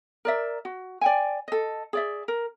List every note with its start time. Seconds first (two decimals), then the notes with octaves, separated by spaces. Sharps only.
0.25 A#4 D5 E5
0.65 F#4
1.01 D5 G5 G#5
1.48 A4 D#5
1.93 G#4 D5 E5
2.28 A#4